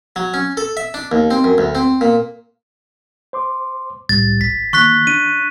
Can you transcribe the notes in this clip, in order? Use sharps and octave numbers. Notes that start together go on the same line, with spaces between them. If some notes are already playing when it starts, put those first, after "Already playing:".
F#3
C#4
A4
E5
D4
D#2
C4
F#2
D2
C4
A#2
C5 C6 D6
C2 A2 G3 A6
G#1 B6
D#3 A#3 C#6 F#6 B6
D4 D#7